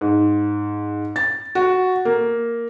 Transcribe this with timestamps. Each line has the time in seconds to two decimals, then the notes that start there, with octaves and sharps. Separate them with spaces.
0.01 G#2
1.16 A6
1.55 F#4
2.05 A#3